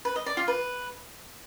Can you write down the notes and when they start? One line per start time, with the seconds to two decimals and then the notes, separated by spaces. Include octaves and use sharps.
0.05 B4
0.16 D#5
0.26 D5
0.37 F4
0.48 B4